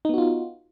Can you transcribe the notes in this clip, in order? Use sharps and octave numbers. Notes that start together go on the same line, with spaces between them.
B3 D#4 F4 F#4